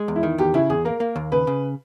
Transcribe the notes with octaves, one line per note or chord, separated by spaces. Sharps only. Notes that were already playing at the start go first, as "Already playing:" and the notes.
Already playing: G#3
E2
E4
D#3
E2 G4
C#3 E4
E2 G#4
A#3 A#4
A#3
D#2
C#3 B4
C#3